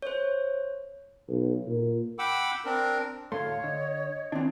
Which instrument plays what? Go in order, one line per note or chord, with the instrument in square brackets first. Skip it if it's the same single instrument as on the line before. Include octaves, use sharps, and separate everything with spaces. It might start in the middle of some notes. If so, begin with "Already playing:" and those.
[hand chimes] C5 C#5
[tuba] B1
A#2
[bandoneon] F#5 G5 B5 D6 E6
C4 D4 A#4
[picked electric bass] D2 A2 A3 [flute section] C#5 [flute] F5 [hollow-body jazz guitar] C6
[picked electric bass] D3 [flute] D#5
[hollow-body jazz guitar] D#3 E3 C4 [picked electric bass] D4